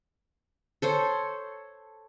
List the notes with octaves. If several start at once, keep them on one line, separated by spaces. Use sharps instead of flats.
A4 C5 C#5